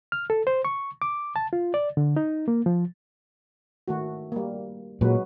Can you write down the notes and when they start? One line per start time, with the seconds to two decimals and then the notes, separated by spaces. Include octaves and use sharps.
0.12 F6
0.30 A4
0.47 C5
0.65 C#6
1.02 D6
1.36 A5
1.53 F4
1.74 D5
1.97 D3
2.16 D#4
2.48 A#3
2.66 F3
3.88 D#3 A3 F#4
4.32 G3 A#3
5.01 A#2 F#3 G#3 B4